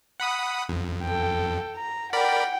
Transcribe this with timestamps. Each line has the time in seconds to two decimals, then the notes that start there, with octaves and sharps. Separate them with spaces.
0.20 F#5 B5 D#6
0.69 F2
1.03 A4 G5
1.76 A#5
2.13 A#4 D5 F#5 G5 B5